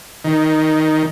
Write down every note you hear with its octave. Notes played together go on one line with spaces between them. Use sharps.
D#3